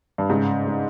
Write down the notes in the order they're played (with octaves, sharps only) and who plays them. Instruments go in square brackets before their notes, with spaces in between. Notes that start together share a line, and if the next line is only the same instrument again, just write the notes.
[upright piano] G2
[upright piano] G#2 [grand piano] C#3
[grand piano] G#3